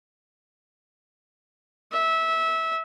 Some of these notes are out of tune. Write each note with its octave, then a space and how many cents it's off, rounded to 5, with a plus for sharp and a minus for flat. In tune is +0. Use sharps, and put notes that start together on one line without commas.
E5 -20